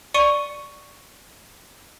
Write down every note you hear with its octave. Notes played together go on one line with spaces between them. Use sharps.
D5 C#6 C#7 D#7 G7